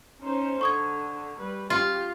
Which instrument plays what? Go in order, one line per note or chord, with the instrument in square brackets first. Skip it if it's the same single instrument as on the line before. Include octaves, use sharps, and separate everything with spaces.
[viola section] C#4 D#4 C5
[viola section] D3 [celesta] C#6 D#6 G#6
[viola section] G3 B4
[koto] F4 [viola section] G4